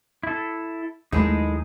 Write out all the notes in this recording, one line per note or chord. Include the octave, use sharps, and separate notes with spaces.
E4 A4
D#2 F#3 G#3 A3 D#4 E4 G#4